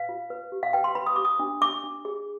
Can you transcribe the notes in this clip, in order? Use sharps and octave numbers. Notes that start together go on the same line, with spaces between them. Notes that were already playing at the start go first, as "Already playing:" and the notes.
Already playing: B4 F5
F4
B4
G4
F5
B4 G5
C6
B4 B5
D#6
G4 D6
D#6
D4
D4 D6
D4
G#4